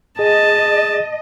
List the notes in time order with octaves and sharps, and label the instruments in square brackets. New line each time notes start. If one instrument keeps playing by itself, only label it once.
[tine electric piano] G#4 [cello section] D#5 [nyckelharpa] A5